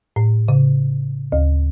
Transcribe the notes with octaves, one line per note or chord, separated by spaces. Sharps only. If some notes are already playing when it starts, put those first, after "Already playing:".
A2
C#3
D2